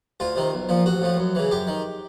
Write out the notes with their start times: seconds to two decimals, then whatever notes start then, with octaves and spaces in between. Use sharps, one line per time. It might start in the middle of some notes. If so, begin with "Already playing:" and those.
0.20 D2 F4
0.36 C3 D#3
0.53 B1
0.69 A#2 F3
0.86 A1 F#4
1.02 A2 F3
1.18 F#2
1.35 C#3 E3
1.51 F#2 G4
1.67 D#3